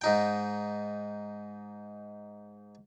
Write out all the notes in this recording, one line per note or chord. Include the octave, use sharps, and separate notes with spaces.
G#2 D#4 G5